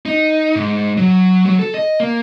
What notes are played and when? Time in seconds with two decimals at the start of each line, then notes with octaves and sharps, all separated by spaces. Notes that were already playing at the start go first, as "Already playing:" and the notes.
0.06 D#4
0.56 G#2
0.97 F#3
1.46 F#3
1.59 A4
1.74 D#5
2.00 A#3